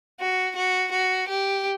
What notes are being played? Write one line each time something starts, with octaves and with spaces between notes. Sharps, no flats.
F#4
F#4
F#4
G4